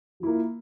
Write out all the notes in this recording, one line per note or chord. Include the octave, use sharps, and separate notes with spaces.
F3 A#3 E4